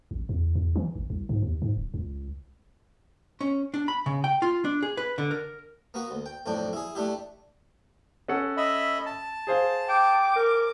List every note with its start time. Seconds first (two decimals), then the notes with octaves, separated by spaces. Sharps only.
0.11 A1
0.29 E2
0.55 E2
0.76 E3
0.95 G#1
1.10 C2
1.29 G#2
1.43 D#2
1.62 G#2
1.76 D1
1.94 C#2
3.41 C#4
3.74 D4
3.88 B5
4.06 C#3
4.24 G5
4.42 F4
4.65 D4
4.83 G#4
4.97 B4
5.18 D3
5.31 A#4
5.94 A#3 B3 F#4
6.11 D2
6.26 G5
6.46 B1 F2 A2 D4 G5
6.73 E4 G#4
6.95 A3 D4 E4 G4
8.28 C#4 A4 F#5
8.57 D#5 E5 B5
9.06 A5
9.47 G#4 C5 F5
9.89 G5 D6
10.36 A#4